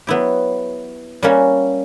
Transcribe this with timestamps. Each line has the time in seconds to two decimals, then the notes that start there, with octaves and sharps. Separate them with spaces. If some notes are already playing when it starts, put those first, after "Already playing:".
0.07 F#3 B3 E4 G4
1.23 G3 A#3 C#4 F#4